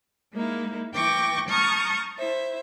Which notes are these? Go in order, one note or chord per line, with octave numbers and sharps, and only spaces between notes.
G#3 A#3 D#4 E4
E3 E4 G5 C#6 D6 A#6
A5 A#5 C#6 D#6 F6 G6
E4 C5 E5